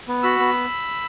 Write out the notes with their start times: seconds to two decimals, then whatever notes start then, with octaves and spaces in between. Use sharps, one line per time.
0.08 B3
0.23 F#4 B5 E6
0.39 B3